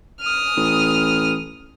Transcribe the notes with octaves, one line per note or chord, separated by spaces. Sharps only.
D#6 F6
A1